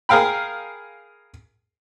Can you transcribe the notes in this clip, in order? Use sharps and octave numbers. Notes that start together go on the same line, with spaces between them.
G#4 A#4 F5 G5 B5